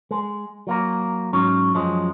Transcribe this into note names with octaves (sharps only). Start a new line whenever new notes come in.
G#3
F#3 A#3 A#4
G#2 F#3 C#4
F#2 F3 F#3 G#3